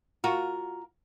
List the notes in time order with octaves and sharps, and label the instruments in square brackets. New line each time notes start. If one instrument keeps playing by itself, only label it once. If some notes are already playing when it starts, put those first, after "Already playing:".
[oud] F4 F#4 [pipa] A#4